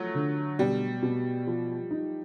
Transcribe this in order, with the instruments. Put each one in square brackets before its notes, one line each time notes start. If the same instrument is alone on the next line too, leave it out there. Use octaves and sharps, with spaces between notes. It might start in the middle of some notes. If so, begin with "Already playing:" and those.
Already playing: [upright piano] F3 [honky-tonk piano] F#3 A3
[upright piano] D3
[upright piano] B2 [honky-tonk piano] G3
[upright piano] B2
F3
D#4